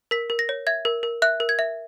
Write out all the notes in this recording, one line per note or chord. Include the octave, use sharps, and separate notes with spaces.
A#4 B6
A#4
A#6
C#5
E5 G#6
A#4
A#4
E5 F#6
A#4
G#6
E5